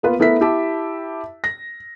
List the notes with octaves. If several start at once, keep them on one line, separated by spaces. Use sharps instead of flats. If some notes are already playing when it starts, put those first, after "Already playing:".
A#3 B3 F4 B4
A3 B3 E4 A#4 E5 B6
E4 G4 E5 A5
A#6